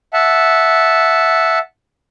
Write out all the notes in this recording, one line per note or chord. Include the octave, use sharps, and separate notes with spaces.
E5 F#5 A5